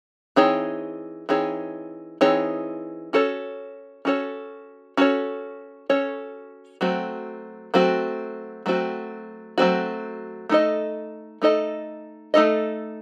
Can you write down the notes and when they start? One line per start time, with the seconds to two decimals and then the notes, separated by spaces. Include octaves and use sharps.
0.36 E3 C4 D#4 G#4 C#5
1.29 E3 C4 D#4 G#4 C#5
2.21 E3 C4 D#4 G#4 C#5
3.13 C#4 F#4 A4 C#5
4.05 C#4 F#4 A4 C#5
4.97 C#4 F#4 A4 C#5
5.89 C#4 F#4 A4 C#5
6.81 F#3 A3 C4 F#4
7.74 F#3 A3 C4 F#4
8.66 F#3 A3 C4 F#4
9.58 F#3 A3 C4 F#4
10.49 A3 D#4 A4 D#5
11.42 A3 D#4 A4 D#5
12.34 A3 D#4 A4 D#5